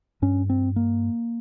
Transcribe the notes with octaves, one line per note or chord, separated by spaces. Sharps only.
G2 C#4
C4
A#3